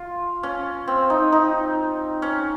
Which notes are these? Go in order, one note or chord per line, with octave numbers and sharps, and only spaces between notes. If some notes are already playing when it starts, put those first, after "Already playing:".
Already playing: F4
C#4
C4
D#4
D#4
C#4